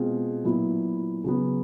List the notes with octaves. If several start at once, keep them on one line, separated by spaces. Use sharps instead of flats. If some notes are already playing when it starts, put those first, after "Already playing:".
Already playing: B2 G#3 C4 F4 G#4
A#2 F#3 B3 E4
C#3 F#3 B3